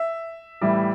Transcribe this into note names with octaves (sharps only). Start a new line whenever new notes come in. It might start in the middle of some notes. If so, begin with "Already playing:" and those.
Already playing: E5
A2 E3 G3